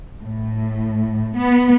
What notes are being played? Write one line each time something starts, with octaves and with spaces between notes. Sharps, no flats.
A2
B3